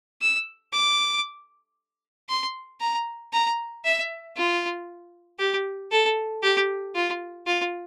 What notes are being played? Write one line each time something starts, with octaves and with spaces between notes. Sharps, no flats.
E6
D6
C6
A#5
A#5
E5
F4
G4
A4
G4
F4
F4